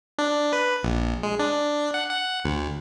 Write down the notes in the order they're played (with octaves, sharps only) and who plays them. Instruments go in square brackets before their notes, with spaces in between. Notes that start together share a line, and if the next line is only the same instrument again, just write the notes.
[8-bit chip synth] D4
B4
A#1
G#3
D4
F#5
F#5
D2